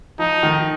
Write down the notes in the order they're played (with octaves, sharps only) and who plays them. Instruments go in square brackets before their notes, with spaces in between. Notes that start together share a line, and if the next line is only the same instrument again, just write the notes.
[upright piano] F3 [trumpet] D#4
[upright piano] D#3